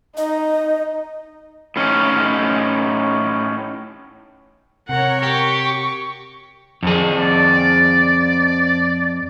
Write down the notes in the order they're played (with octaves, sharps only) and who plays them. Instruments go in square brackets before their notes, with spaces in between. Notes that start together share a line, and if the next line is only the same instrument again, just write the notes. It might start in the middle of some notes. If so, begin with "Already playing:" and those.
[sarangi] D#4 [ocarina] D#5
[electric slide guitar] A2 C#4 D#4
[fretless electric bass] C3 [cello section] A#4 C#5 [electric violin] F#5
[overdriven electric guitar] G4 [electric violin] C#6
[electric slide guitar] F2 G#4
[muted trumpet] D5